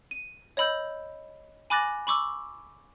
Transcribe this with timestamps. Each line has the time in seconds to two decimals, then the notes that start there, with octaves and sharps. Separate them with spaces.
0.11 D#7
0.57 C#5 D#5 B5 E6 G6
1.70 G#5 B5 D6 F#6 A6 A#6
2.07 B5 C#6 D6 E6